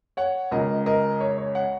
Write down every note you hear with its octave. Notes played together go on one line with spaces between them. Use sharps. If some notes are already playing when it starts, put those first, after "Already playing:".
C#5 F#5
C#2 C#3 A#4 D#5
A#4 D#5
C#5
C#5
C#5 F#5